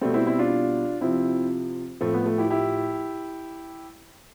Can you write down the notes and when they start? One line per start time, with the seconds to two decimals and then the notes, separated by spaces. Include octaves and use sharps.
0.01 B2 G3 A3 C4
0.14 C4 E4
0.26 C4 E4
0.39 D4 F4
1.01 C3 F3 C4 E4
2.01 A2 F3 A3 C4
2.14 B3
2.26 A3
2.38 E4 G4
2.50 E4 G4